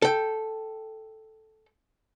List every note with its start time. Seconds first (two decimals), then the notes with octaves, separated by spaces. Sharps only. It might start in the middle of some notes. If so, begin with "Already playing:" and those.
0.02 A4 G5